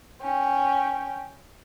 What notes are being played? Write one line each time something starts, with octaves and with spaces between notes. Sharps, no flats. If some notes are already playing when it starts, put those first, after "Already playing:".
C#4 G5